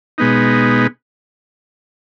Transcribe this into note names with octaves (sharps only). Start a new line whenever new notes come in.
B2 G#3 B3 D#4